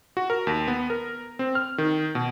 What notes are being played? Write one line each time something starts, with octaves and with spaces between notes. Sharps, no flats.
F#4
A#4
D#2
B3
A#4
C4
F6
D#3
B2